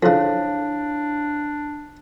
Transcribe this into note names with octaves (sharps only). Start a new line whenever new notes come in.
F2 C#3 D4 E4 C#5 F5